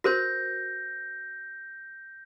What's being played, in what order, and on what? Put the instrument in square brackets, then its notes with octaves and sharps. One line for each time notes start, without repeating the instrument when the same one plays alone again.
[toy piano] F#4 A#4 C5 [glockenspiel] G6 A#6